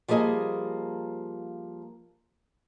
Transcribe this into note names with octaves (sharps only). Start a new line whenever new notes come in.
F3 G3 A#3 G#4 D#5